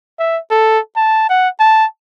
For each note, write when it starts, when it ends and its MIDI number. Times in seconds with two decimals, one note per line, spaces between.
0.19 0.39 76
0.51 0.79 69
0.96 1.27 81
1.29 1.48 78
1.60 1.85 81